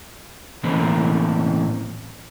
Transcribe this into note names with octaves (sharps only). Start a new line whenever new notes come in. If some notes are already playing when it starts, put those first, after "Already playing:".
A2 E3 A#3 C4 C#4 E4